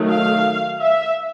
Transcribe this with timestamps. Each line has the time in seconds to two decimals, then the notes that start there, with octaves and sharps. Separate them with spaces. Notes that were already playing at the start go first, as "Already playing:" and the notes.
Already playing: D#3 F#3 A3
0.09 F5
0.81 E5